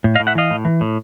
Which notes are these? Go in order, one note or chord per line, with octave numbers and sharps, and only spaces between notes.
A2
D#5 F5
A2
E5 F#5
E3 D#5 F5
A2
E3
A2